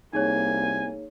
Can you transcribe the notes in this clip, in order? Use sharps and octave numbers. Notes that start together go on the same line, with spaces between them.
C2 A#3 D#4 G#4 C#5 G#5